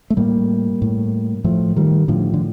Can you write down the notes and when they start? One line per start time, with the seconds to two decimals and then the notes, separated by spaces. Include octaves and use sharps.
0.10 A3
0.17 A2 G3 A#3
0.82 A2
1.44 A2 F3 A3
1.76 D#3 G3
2.08 A2 D3 F3
2.34 D3